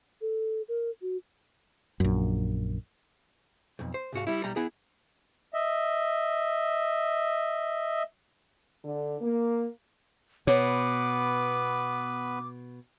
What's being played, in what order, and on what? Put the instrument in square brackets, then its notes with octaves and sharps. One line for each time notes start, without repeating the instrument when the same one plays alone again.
[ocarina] A4
A#4
F#4
[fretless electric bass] A#1 F#2
[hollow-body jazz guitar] B1 F2
C5
C2 G#2 F#4 F5
G3 E4
B1 G3 A#5
B3 E4 G#4
[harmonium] D#5 E5
[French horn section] D3
A#3
[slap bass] B2 [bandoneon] B3 B4 [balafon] C#5 [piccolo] D6